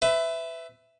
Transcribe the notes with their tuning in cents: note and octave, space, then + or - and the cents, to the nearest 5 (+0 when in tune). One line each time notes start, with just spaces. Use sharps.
B4 +25 E5 +0